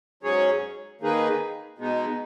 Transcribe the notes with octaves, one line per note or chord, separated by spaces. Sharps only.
G#2 F#3 C#4 G#4 C#5
D#3 A#3 D#4 G#4 B4
B2 G#3 B3 D#4